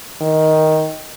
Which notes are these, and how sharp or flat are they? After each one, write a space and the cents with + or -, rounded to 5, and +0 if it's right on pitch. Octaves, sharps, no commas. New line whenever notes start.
D#3 +10